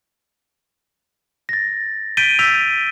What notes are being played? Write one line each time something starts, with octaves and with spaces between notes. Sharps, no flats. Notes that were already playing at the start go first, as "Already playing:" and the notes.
A6 A#6
G6 A6 B6 D7 D#7 G7
E6 G6 B6 D#7 F7